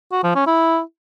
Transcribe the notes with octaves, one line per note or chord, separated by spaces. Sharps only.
F#4
F3
C#4
E4